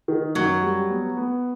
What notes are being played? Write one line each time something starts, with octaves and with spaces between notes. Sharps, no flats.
D#3
F#2 F#3
G3
B3
B3